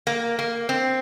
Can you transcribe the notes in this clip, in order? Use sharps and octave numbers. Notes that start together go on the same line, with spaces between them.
A#3
A#3
C4